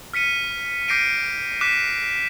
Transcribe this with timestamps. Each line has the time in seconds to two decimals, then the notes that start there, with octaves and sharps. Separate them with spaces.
0.14 F6 B6 C#7 D#7
0.88 D6 G6 A#6 C7 D7 D#7
1.61 D6 F#6 B6 E7